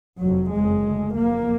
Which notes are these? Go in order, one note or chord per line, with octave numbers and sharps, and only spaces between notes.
F1 F2 F#3
F#1 F2 G#3
D2
F#1 F2 A#3